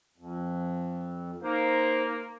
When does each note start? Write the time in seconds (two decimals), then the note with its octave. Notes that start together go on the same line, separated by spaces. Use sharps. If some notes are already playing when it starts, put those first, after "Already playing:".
0.18 F2
1.43 A#3 D#4 C5